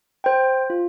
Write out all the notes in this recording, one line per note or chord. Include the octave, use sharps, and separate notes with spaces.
C5 G5
F4